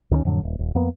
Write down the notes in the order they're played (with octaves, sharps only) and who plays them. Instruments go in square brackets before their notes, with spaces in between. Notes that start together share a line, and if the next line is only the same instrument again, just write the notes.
[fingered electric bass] D2 D#3 F#3 C#4
F2 A2 D3 F#3
D#1
D#1
F2 A#3 B3